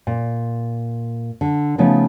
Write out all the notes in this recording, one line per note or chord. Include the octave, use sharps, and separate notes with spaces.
A#2
D3
C#3 F3 A3 B3 D#4